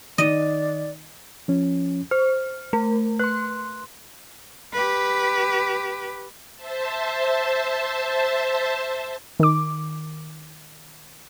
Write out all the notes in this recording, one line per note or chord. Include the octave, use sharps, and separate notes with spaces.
D#3 D5 D#5
F3 C#4
C5 F6
A3 A#4
B4 C6 F#6
G4 B4
C5 E5 A5
D#3 D6